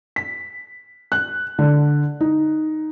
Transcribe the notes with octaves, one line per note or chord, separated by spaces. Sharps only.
B6
F#6
D3
D#4